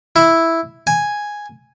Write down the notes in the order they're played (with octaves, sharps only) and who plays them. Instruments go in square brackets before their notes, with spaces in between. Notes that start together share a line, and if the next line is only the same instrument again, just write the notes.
[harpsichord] E4
G#5